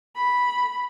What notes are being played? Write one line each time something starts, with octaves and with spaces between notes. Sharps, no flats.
B5